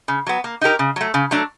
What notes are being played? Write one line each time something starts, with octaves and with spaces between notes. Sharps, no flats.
C#3
F#3 B3
A#3
D#4 G4 A#4
C#3
F#3 A3
C#3
F#3 A3 D4